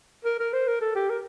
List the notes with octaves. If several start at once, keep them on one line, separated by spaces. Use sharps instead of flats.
A#4
A#4
C5
A#4
A4
G4
A#4